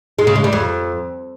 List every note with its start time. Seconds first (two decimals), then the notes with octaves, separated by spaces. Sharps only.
0.19 G#3
0.27 C#3
0.36 G#3
0.44 G3
0.53 F2